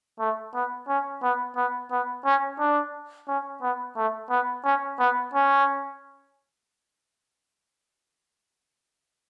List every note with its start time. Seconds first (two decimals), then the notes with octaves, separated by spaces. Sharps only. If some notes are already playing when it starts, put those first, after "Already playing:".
0.20 A3
0.54 B3
0.88 C#4
1.23 B3
1.56 B3
1.91 B3
2.25 C#4
2.59 D4
3.28 C#4
3.62 B3
3.97 A3
4.30 B3
4.65 C#4
4.99 B3
5.34 C#4